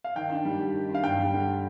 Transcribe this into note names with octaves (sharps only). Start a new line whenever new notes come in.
F5
D#3 G5
D4
G3
G4
D#3
D4 F5
G2 G5
G3
D3